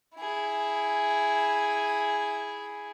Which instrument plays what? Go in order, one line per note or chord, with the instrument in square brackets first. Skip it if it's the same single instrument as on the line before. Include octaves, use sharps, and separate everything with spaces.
[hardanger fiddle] E4 G#4